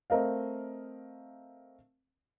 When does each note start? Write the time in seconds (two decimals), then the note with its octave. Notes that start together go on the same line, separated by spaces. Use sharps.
0.10 A3 C4 A#4 D#5 F5